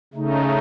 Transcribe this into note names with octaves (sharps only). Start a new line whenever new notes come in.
C#3 A3 D#4